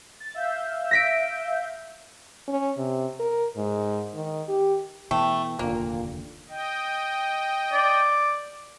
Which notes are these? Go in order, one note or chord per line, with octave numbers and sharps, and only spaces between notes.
A6
E5 F5 G6
A#6 B6 D7
C#4
C3
A#4
G#2
D#3
G4
B2 E3 A3 G5 A5
F1 D#2 A#2 D3 A#3
D#5 G5
D5